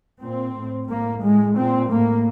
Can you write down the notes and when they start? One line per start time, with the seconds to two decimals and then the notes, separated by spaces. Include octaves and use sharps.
0.21 A#2 C4
0.55 A2
0.89 A2 A#3
1.22 A2 G#3
1.57 A#2 C4
1.90 A2 A#3